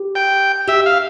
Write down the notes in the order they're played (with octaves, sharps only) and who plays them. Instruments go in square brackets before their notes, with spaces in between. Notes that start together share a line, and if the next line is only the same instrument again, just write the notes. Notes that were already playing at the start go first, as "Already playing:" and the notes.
Already playing: [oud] G4
[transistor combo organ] G5
[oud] G4 [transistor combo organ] E5
[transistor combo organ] F5